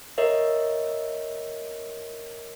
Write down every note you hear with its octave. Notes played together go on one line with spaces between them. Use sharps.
A#4 C#5 D#5 E5